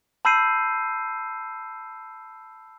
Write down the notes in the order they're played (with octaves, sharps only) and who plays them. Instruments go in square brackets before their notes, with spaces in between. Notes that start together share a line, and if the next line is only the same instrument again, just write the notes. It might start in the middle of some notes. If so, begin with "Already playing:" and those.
[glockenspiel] A5 B5 E6 G6 C7 D#7